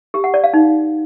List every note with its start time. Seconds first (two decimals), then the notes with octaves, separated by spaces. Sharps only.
0.14 G4
0.24 F#5
0.34 D5
0.44 F5
0.53 D#4